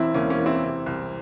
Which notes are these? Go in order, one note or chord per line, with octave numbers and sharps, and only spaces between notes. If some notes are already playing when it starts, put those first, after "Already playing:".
Already playing: E1 E2 C4 E4
E1 A#3 C#4
A#3 C#4
E3
C4 E4
C3
C2